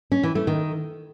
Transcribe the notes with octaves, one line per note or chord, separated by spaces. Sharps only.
C#4
E3
A3
D#3